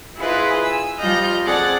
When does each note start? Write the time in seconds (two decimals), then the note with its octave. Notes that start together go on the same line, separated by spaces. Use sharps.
0.17 E4 F4 G#4 B4 C5 D#5
0.63 G#5 E6
0.97 F3 G3 F4 D#5 F6 G6
1.44 C4 G#4 A4 D5 F#5 A6